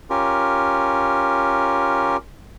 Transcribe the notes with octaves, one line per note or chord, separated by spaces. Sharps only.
C#4 F4 G4 A#4